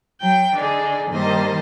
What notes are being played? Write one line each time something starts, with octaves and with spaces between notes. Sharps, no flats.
F#3 G5 G6
D3 D4 D#4 G#4
G2 D#3 A#3 C5 D#5 A5